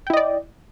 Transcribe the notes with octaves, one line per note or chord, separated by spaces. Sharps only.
E4 D5 D#5 G5